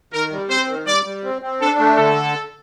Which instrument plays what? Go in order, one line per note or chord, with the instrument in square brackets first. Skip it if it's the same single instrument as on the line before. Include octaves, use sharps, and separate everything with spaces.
[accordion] D#3 [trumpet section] A#4
[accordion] G3
[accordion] C4 [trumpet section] C5
[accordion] D#3
[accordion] G3 [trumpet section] D5
[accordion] G3
C4
C4
[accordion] D4 [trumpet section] A4
[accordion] A3
[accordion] D3 [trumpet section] A4